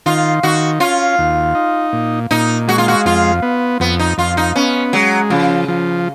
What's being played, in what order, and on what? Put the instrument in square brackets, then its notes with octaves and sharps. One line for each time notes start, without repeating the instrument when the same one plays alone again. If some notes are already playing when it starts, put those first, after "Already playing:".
[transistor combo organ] D#3 [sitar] F4
[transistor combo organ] D#3 [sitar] F#4
[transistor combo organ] C#4 [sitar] F4
[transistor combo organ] D#2
D#4
A#2
[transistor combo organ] A#2 [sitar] D#4
[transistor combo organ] G#3 [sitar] F#4
[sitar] F4
F#4
[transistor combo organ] F2 [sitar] F4
[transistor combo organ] B3
[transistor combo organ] F2 [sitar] B3
[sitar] D#4
[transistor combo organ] F2 [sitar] F4
[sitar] D#4
[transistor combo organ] B3 [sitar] C#4
[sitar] F#3 [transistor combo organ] G#3
[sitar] C#3 [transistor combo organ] F3
[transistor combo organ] F3